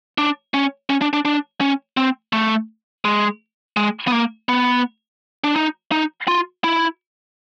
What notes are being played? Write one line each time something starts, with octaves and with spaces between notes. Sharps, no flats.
D4
C#4
C#4
D4
D4
D4
C#4
C4
A3
G#3
G#3
B3
A#3
B3
D4
D#4
D#4
F4
E4